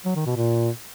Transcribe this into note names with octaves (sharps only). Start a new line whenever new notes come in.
F#3
D#3
B2
A#2